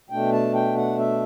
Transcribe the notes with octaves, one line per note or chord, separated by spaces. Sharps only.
B2 A3 D4 G5
A5
G5
F#5
E5